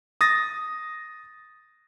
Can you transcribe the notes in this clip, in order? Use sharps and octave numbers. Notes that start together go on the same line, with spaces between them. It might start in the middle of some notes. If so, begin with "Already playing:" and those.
D#6 A6 A#6